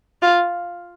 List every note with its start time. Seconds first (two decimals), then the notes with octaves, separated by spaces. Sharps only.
0.22 F4